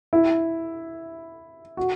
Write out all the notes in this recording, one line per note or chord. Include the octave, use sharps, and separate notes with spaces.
E4
F#4